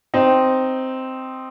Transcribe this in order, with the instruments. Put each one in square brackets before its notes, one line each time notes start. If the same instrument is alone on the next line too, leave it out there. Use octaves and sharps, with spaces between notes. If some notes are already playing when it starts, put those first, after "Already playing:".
[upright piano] C4 D#4